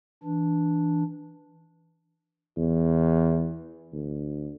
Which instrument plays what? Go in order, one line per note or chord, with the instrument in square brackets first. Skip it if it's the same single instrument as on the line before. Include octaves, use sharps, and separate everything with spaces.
[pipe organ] E3 D4
[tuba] E2
D2